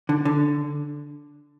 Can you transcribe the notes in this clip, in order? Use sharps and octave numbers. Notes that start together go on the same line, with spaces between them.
D3
D3